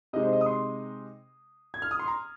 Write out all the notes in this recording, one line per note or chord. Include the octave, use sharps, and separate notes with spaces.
C3 G#3 D#4 D#5
C5
D#5
D#6
C6
G#6
F6
D#6
C6
A#5